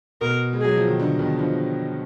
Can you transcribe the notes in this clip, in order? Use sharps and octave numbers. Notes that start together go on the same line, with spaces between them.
B2 A#4
G#3
F#3 G#4
F3
D#3
D3
B2 D#3
D3 F3